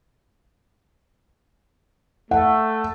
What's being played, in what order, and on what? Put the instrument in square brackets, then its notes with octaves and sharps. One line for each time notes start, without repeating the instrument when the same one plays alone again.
[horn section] A3 [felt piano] F#5